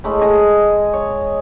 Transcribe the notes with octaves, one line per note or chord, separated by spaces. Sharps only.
A2 G#3 A3 B5
G#4 D#5 A#5
C#5